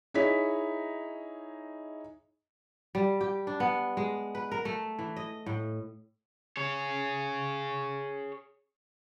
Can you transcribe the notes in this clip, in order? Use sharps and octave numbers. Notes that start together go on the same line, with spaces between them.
D#4 E4 G#4 C#5 B6
G3
G4
D4
B3
G#3
B4
A#4
A3
E3
D#5
A2
G#4 C#5